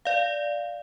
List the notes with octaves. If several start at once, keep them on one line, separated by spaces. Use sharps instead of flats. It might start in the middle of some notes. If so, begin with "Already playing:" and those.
D5 F5